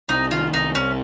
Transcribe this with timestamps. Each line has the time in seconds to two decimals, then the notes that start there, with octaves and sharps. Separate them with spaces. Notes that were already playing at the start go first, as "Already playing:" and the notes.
0.09 C2 D#4
0.31 D#3 F4
0.53 C2 D#4
0.75 C2 C#4